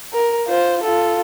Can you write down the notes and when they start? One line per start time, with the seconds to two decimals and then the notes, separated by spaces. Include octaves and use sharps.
0.13 A#4
0.48 F4 C5
0.83 F4 A4